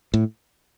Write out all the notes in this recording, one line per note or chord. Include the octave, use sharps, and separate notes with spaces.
A2